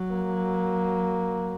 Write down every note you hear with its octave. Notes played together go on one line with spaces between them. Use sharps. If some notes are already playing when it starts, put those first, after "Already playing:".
Already playing: F#3
A#3